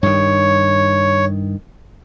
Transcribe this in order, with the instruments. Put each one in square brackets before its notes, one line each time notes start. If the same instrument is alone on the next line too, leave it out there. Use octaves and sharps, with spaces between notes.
[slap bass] G2 D#3 [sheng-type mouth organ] C#5